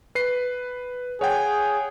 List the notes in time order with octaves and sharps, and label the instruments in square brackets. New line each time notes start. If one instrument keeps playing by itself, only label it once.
[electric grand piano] B4 C7
[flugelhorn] G#4 [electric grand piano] C#5 F#5 G5